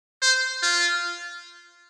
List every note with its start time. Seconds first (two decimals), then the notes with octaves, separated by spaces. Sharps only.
0.22 C5
0.63 F4